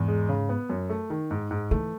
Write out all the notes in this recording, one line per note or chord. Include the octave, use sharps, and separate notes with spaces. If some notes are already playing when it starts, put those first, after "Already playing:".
Already playing: E2 G#2
G#3
C#3
B3
F#2
A3
D#3
G#2
G#2
E3 A3